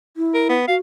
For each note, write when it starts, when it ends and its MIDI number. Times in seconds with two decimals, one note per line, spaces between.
0.17 0.54 64
0.34 0.48 70
0.49 0.67 59
0.68 0.76 66
0.68 0.75 77